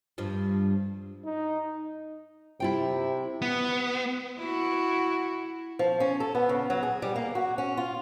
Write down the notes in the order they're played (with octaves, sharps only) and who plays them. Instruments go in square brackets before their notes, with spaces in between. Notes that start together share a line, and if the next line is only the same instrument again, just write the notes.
[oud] G2 F3
[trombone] D#4
[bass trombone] C3 [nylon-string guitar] E4 F4 G5
[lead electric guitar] B3
[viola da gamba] E4 F#4
[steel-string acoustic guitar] F3
C#4
A4
B3
C#3
F#3
G#4
G3
A#3
F#4
C#4
F4